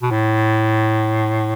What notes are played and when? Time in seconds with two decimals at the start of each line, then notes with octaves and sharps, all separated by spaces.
0.02 B2
0.10 A2